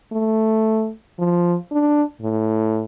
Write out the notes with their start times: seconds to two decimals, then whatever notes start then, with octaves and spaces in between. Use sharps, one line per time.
0.12 A3
1.19 F3
1.72 D4
2.21 A2